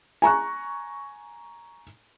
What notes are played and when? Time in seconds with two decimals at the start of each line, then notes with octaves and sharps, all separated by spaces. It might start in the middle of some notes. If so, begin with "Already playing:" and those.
0.22 G#5 A#5 C#6 F#6